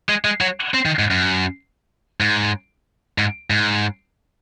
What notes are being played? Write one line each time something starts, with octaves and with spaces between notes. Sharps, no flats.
G#3
G#3
F#3
C4
D#3
G#2
F#2
G#2
G#2
G#2